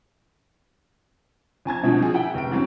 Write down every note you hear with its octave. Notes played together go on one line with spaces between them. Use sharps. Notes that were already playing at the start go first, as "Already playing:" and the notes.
F2 G#5 A5 G#6
B2 D3 F3 C4
F3 C4 G#4
E4 F#5 G5
F1 D7
E3 F#3 C4 C#4